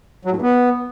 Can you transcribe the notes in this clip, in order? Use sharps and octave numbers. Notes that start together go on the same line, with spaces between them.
F#3
A2
G2
B3